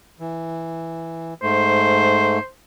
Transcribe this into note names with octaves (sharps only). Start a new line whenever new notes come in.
E3
G#2 A3 C5